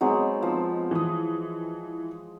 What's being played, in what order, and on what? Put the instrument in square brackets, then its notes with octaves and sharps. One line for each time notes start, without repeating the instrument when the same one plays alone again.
[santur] F#3 G#3 [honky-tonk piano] B3 C4 D#4
[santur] F3 E6
[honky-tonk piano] E3 D#6